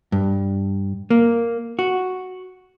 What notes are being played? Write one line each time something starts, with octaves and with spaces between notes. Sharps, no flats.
G2
A#3
F#4